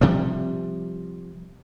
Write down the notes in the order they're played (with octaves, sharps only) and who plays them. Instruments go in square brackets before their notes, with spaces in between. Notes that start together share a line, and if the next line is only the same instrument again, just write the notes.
[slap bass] C3 F3 G3